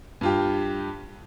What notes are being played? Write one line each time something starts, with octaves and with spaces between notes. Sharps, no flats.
G2 F4 G4